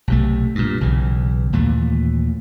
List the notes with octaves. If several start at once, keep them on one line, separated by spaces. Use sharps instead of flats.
B1 C3 A3
G2 A#2
B1 C#3 E3
D#2 A#2 E3 A3